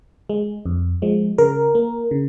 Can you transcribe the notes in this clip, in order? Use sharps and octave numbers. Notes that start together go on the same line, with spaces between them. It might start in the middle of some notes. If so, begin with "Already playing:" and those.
G#3
F2
F3 G#3
C#3 A#4
A#3
C#3